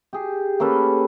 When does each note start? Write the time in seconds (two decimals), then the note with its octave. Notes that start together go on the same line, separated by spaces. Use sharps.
0.13 G4 G#4
0.60 A#3 C#4 A4 B4